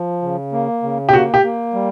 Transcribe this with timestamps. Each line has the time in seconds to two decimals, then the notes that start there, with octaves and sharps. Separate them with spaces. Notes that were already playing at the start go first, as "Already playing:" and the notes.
Already playing: F3
0.22 C#3
0.52 A#3
0.83 C#3
1.09 G4
1.13 A#3 F#4
1.34 G4
1.43 A#3
1.74 G3